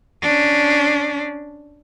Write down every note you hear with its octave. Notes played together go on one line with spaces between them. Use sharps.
C#4 D4